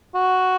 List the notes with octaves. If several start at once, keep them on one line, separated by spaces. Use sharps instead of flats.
F#4